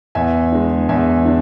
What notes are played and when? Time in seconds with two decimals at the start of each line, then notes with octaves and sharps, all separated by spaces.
0.15 E2 E5 G#5
0.52 D3 G#3
0.89 E2 E5 G#5
1.25 D3